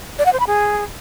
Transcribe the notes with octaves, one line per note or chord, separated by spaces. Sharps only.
D5
F#5
C5
B5
G#4